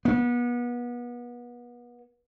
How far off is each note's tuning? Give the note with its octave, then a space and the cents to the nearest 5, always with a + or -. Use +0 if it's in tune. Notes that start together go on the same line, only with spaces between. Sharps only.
B3 -30